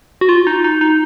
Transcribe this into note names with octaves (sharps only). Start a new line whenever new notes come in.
F#4
F4
D#4
D#4
D#4